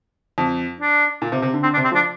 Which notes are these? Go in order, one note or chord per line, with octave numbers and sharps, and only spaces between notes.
F2
D4
A#2
C3
C3
D3
D3 C4
D4
C3
C4
F3
D4